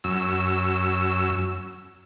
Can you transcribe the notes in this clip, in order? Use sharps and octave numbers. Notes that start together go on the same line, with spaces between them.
F#2 E6